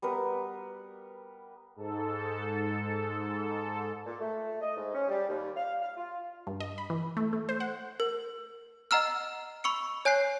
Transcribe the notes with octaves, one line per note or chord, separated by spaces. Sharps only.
G3 B3 A#4 B4
G#2 A4
A#2
A3
D#5
G#2
C#4
G3
D#2
F5
F5
F4
G2
D#5
B5
E3
A3
A3
C5
F#5
A#4
D#5 F#5 A#5 E6 F6
B5 C#6 E6 C#7
C#5 G#5 F#6 G6 C7